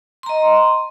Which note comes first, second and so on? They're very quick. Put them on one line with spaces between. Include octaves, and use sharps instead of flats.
C6 A#5 D#5